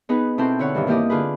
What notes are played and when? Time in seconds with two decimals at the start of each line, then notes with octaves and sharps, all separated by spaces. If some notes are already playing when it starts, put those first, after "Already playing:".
0.09 B3 D#4 G#4 B4
0.38 B2 C4 E4 A4 G5 C6
0.59 D3 B4 C#5 F#5
0.74 G2 D#3 E3 G3
0.87 G3 A#3 E4 G4 D5 D#5
1.10 D3 F4 G#4 B4